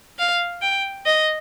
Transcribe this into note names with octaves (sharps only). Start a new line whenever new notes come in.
F5
G5
D#5